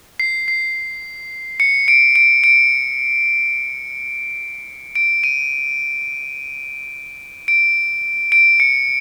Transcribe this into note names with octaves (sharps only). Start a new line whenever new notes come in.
C7
C7
C#7
D7
D7
D7
D7
D#7
D7
D7
C#7